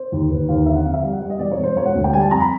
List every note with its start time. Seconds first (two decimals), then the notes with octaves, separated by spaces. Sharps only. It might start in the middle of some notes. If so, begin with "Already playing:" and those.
Already playing: C5
0.12 D#2
0.29 D#2 B4
0.49 D#2 F5
0.66 D3 E5
0.75 F#5
0.85 F2 F5
0.94 E5
1.03 G3 F5
1.12 F#5
1.21 G3
1.30 D#5
1.39 E1 D5
1.51 C#5
1.58 E1
1.63 C5
1.76 E1 C#5
1.85 F#5
1.95 D2
2.04 G5
2.13 G3 G#5
2.21 A5
2.31 F2 A#5
2.40 B5